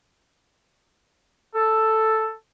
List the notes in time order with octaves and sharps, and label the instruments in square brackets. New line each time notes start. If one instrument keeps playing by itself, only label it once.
[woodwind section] A4